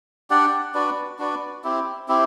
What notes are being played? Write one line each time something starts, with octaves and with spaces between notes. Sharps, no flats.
D4 G4 D5 F#5
D4 F#4 B4 D5
D4 F#4 B4 D5
C4 E4 G4
C4 E4 G4